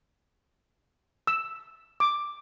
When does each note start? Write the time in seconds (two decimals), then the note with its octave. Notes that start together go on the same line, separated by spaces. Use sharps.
1.27 E6
2.00 D6